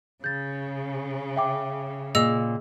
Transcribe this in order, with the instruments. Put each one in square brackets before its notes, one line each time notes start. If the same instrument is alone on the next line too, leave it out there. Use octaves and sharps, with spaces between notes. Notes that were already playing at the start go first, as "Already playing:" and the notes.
[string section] C#3 [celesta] G6 A6
[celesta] E5 G5 D6
[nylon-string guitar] A#2 [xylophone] G#4 D#5 E6